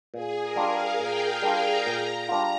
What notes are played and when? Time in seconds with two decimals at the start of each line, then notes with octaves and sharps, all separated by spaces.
0.14 A#2 G#4
0.42 A#4
0.56 G3 D4 F4
0.71 F5
1.00 A#2 G5
1.29 G5
1.43 G3 D4 F4
1.57 A#5
1.85 A#2 A#5
2.29 G3 D4 F4